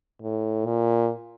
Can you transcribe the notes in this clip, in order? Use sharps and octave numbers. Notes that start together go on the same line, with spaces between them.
A2
A#2